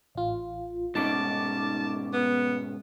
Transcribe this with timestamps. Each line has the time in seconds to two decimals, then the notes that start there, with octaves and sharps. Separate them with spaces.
0.15 A1 F4
0.95 G#2 B2 C#4 D#4 A5 D6
2.13 B3